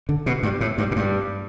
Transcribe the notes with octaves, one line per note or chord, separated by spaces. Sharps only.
D3
B2
G2
A2
G2
A2
G2